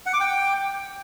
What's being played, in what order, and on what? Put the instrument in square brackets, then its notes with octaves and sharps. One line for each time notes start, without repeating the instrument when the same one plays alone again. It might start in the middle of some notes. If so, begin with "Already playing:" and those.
[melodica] F#5
D6
G5